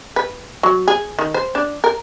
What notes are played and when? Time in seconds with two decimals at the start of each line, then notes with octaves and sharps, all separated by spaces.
0.16 B4
0.63 F#3
0.88 G#4
1.19 D#3
1.34 C5
1.55 D4
1.84 A#4